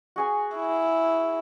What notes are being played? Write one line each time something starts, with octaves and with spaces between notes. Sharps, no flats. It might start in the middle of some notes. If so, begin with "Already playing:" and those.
F#4 G#4 G#5
E4